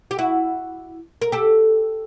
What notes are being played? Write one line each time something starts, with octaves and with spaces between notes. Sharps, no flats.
G4
E4 F#4
A#4
G4 A4